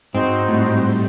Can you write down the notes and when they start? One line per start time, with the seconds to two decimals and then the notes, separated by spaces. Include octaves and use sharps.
0.15 G#2 C4 D#4 F#4 C5
0.48 A2 G3 C4